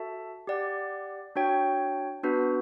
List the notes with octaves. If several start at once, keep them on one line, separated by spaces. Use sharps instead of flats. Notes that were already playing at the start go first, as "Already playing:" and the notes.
Already playing: F#4 A4 E5 A5
G4 D5 F#5
D4 F#4 C#5 G5
B3 D4 F#4 B4